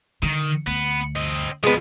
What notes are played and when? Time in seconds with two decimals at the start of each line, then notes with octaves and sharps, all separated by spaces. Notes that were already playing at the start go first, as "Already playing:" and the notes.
0.23 D3 D#3
0.67 D2 B3
1.16 C4 D#5
1.63 C2 F3 G#3 B3